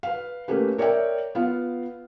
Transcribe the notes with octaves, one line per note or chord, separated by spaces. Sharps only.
B4 F5
A3 A#3 C#4 G4 B4
A#4 C#5 D5 E5 G5
B3 F4 F5